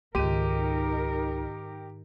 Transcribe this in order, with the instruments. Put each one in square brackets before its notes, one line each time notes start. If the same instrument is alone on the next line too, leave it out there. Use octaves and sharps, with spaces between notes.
[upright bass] C#2 [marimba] G#2 D#3 [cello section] D#4 A#4 [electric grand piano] G4 D#7